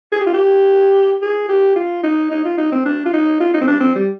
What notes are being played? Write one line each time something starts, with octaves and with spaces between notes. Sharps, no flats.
G#4
G4
F4
G4
G#4
G4
F4
D#4
D#4
F4
D#4
C4
D4
F4
D#4
F4
D#4
C4
D4
C4
G3